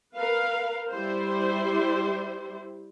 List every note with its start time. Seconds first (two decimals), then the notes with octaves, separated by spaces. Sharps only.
0.16 A#4 B4 F5
0.91 G3 E4 C5